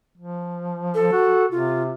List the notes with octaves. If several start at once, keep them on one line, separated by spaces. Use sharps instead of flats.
F3
A4
F#4
C3 F4